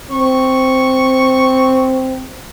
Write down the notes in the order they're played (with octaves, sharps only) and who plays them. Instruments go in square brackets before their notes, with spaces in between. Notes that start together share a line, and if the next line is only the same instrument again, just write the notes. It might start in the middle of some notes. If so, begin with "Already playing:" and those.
[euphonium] C4 [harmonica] C#6